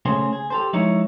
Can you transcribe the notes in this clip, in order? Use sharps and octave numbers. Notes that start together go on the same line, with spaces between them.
C#3 A3 C#4 G#4 C5
G#4
G4 A4 C5
F3 G#3 D#4 E4 A#4 C#5